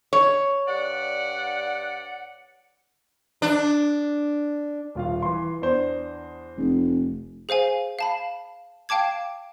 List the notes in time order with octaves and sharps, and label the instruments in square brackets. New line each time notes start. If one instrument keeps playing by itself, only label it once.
[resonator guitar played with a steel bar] C#5
[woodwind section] G2 D5 F#5
[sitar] D4
[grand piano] D#1 F4 F5
E3 C6
E2 D4 C5
[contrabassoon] F1
[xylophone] G#4 C5 F5 G#5
F5 A5 B5
F5 G5 A5 D6 G#6